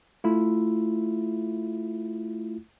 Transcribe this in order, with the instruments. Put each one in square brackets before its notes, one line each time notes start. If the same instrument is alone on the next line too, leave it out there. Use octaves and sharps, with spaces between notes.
[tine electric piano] A3 E4 F4